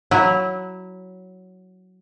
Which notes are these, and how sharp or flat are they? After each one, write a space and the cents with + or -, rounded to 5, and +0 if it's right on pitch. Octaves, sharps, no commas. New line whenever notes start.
F#3 +0 E4 -15